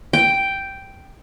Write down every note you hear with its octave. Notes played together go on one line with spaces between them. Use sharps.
G5